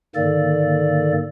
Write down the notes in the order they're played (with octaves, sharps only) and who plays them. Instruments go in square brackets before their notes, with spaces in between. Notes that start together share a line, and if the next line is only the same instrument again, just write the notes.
[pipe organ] G#2 D3 D#3 A#3 A4 D5